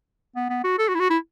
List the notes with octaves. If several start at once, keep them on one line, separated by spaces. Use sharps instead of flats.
B3
B3
F#4
A4
F#4
E4
F#4
E4